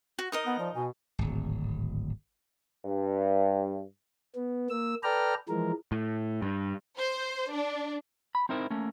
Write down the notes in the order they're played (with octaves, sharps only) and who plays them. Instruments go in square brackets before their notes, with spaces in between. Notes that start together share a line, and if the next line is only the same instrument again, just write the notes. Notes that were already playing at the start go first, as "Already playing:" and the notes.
[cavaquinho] F#4
[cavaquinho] D#4 A#4 D#5 [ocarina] D#6
[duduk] B3 [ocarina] F#5
[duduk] F3 [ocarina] D5
[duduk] B2 [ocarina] G#5
[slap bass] D1 G#1
[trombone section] G2
[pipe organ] B3
A#3 E6
A4 B4 D5 G5 A#5 F6
E3 F3 G#3 A#4
[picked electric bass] A2
G2
[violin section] C5
D4
[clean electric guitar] B5
C4 D#4 E4 A#4 C5
A3 A#3 C#4